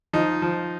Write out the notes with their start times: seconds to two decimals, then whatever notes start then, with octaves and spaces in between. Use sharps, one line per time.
0.13 F3 D#4
0.42 F3